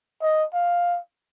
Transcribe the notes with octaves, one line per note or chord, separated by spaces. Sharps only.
D#5
F5